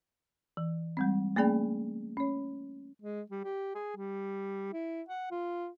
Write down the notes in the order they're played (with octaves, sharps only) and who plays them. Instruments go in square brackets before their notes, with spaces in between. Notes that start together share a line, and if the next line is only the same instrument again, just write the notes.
[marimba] E3
G3 G#3 C4
A3 A#3 C#4 G#4 D5 G5
C#4 C#5
[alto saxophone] G#3
G3
G4
G#4
G3
E4
F#5
F4